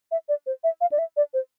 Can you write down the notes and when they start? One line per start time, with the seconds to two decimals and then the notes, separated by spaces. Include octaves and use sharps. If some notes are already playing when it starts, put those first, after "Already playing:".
0.11 E5
0.29 D5
0.46 C5
0.64 E5
0.81 F5
0.92 D5
0.98 E5
1.17 D5
1.34 C5